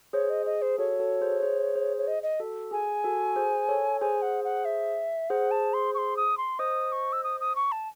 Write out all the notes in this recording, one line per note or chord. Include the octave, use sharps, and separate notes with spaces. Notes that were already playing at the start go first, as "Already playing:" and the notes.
G#4 C5 C#5
D#5
G#4 D#5
C5
F#4 A4 C#5
F#4 A4
G#4 C5
G#4 C5
G#4 C5
C#5
D#5
D#5
F#4 A4
G#4 G#5
F#4 A4
G#4 C5
A4 C#5
G#4 C5 G#5
F#5
F#5
E5
G#4 C5 F#5
A5
C6
C#6
C6
D#6
C6
C5 D#5 D#6
C#6
E6
D#6
D#6
C#6
A5